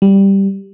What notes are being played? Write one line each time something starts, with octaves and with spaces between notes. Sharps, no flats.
G3